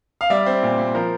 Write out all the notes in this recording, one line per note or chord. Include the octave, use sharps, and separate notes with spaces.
F5
G3 D5 E5
C4
A#2
A#2
F3 A#4 C5